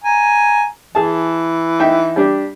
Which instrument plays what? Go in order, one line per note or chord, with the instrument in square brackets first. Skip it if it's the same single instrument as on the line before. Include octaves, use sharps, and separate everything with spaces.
[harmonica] G#5 A#5
[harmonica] E3 [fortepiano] G#4 A5
[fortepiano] D#4 E5 G5
G3 D4 G4